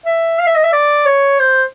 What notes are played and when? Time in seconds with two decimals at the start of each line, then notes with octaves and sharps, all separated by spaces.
0.06 E5
0.39 F5
0.47 E5
0.55 D#5
0.64 E5
0.73 D5
1.06 C#5
1.40 C5